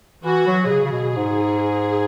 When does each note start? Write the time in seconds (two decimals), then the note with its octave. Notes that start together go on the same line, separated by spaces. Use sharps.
0.24 E3 F#4
0.47 F#3
0.65 B2
0.70 C#3 G#4
0.85 C#3
0.92 B2
1.16 G#2